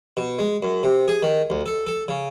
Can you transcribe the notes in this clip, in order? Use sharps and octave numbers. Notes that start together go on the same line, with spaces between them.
B2
G#3
F#2
C3
G#4
D#3
D2
A4
A4
C#3